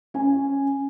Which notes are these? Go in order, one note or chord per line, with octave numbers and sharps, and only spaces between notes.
C#4 G#5